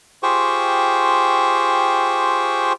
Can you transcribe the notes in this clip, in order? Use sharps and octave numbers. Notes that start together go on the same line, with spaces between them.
F4 G4 G#4 C5 G5 C#6